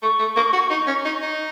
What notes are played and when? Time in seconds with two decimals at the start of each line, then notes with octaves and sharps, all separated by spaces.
0.03 A3 C#6
0.19 A3
0.36 A#3
0.53 F#4
0.70 D#4
0.87 C#4
1.05 D#4
1.22 D#4